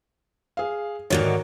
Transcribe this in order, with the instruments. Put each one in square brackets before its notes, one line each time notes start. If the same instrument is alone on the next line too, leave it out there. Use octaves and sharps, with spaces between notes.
[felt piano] G#4 F5
[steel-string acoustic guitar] G#2 D3 D#3 [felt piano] F#4 A#4 C#5